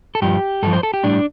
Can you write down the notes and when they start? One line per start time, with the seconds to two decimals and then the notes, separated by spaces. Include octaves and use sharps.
0.15 A4
0.22 G2 F3 G4
0.63 G2 F3 A4
0.73 C5
0.83 A4
0.94 G4
1.03 A2 G3 D4